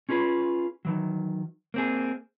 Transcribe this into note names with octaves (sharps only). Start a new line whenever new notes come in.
C#4 F4 G#4 B4
D#3 E3 F#3
A#3 C4 G#4